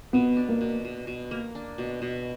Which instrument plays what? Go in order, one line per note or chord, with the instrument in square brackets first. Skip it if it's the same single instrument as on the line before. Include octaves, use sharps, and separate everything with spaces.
[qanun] B2 [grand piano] B3
[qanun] D4
[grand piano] A#3
[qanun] B2
B2
B2
A#3
D4
B2
B2